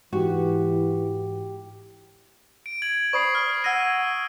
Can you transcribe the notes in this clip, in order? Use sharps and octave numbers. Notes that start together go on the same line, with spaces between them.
G#2 E3 F#4 G4
D7
G#6 F#7
C5 D5 B5 C#6 D#6 C7
F6
F#5 E6 F6 G#6 A#6 D#7